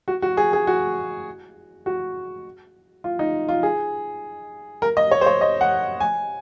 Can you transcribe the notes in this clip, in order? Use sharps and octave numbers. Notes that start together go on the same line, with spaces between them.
F#4
F#4
G#4
G#4
F#4
F#4
F4
D#4
F4
G#4
A#4
D#5
C#5
C5
C#5
D#5
F#5
G#5